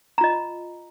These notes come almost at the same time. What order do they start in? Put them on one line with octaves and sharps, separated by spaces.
A#5 F4 D#5